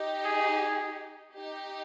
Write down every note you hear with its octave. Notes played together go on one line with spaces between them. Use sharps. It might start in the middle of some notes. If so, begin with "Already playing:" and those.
Already playing: D#4 G4
G#4
D#4 G4